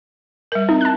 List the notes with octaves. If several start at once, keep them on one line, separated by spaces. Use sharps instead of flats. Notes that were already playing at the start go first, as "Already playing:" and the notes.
G3 A#4
C4 D#4
A5 F#6